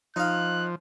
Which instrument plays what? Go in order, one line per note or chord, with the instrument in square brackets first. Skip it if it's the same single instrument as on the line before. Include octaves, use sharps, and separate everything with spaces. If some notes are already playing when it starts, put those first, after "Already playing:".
[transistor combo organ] F3 [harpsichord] D#4 F5 [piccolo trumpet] F#6